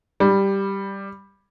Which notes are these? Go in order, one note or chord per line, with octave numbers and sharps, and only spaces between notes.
G3